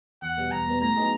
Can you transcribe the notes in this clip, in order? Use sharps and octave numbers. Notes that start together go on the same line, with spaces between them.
E2 F#5
B2 G3 B3
E2 A#5
B2 G3 B3
A2 A#5
F#3 B3 D#4 G#4